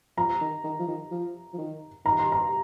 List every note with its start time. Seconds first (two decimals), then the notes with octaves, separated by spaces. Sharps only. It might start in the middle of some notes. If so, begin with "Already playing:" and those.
0.17 F3 A#5
0.41 D#3
0.64 D#3
0.79 F3
0.88 D#3
1.11 F3
1.53 F3
1.58 D#3
2.05 D#3 A#5
2.19 C6
2.32 A#5